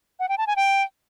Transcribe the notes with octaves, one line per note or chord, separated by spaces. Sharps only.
F#5
G5
A5
G#5
G5